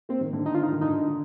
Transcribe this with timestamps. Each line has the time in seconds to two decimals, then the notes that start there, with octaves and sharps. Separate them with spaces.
0.09 A#3 C4
0.21 D#3
0.33 D3
0.46 D#4
0.55 F4
0.63 D#4
0.72 D#3
0.81 D3 D#4